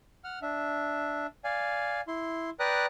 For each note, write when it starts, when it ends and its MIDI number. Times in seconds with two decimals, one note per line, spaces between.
0.24 0.39 78
0.24 0.39 89
0.42 1.27 62
0.42 1.27 76
1.44 2.01 74
1.44 2.01 77
1.44 2.01 80
2.08 2.50 64
2.08 2.50 84
2.60 2.86 71
2.60 2.86 74
2.60 2.86 79
2.60 2.86 82
2.60 2.86 87
2.60 2.86 90